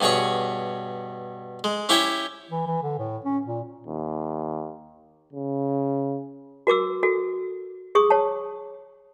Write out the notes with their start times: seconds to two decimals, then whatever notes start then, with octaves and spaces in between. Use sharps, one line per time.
0.01 G2 B2 G#4 C#5 C#6
1.64 G#3
1.89 C#4 E4 G4 C#5 E5 G5
2.50 E3
2.67 E3
2.83 D3
2.99 A2
3.25 C#4
3.46 A#2
3.87 D#2
5.33 C#3
6.67 F#4 A#4 D6 E6
7.03 F#4 A4
7.95 G#4 C#6 D#6
8.10 C#5 A5